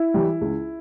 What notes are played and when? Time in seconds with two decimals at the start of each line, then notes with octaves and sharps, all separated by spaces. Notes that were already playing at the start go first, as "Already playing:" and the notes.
Already playing: E4
0.14 E3 G3
0.41 C#2